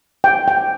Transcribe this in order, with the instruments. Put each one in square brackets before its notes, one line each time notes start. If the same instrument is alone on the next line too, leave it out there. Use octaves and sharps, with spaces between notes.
[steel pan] G5
G5